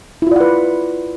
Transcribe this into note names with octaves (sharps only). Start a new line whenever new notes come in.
E4 F4 B4 D5 F#5